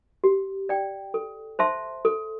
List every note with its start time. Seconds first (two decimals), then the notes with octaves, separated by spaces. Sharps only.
0.24 G4
0.69 D5 G5
1.14 A4
1.59 C5 E5 A5 C6
2.05 A4